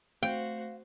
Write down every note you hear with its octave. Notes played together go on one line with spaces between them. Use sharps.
A3 C4 F#4 C5 F5 G5